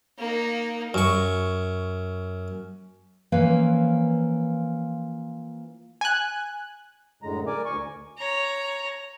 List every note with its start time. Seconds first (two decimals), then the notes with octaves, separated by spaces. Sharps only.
0.18 A#3 D#4
0.94 F#2 C#6
3.32 E3 F3 A#3 C#4 B4 F5
6.01 G#5 F#6
7.22 F#2 A2 D3 G#3 A#5
7.47 A#4 D5 G#5 D6
7.65 D2 G#5 C#6
8.18 C#5 A#5